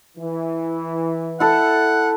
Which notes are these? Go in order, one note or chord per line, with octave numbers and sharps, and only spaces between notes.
E3
E4 A4 F#5